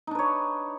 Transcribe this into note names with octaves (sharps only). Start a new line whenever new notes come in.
D4 D#4 B4 C#5